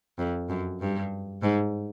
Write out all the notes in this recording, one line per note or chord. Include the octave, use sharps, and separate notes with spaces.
F2
F#2
G2
G#2